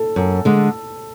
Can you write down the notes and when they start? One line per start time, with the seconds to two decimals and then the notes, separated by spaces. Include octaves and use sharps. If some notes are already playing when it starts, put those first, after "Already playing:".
Already playing: A4
0.16 F#2
0.45 D3 G#3